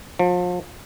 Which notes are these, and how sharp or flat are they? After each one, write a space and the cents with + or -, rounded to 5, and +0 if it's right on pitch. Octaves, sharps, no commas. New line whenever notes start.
F3 +35